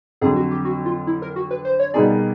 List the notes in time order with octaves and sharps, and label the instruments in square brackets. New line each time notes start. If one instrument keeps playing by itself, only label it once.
[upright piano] F2 D3 F#3 [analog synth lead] G#4
[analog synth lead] F#4
G4
F#4
F4
E4
A#4
F#4
B4
C5
C#5
[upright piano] B2 G3 A#3 D#4 G#4 [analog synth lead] D5